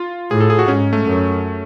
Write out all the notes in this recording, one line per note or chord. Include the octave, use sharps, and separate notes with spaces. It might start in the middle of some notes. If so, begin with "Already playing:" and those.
Already playing: F4
A2 G#4
A4
G#4
F#4
G#2 C#4
A3
F#2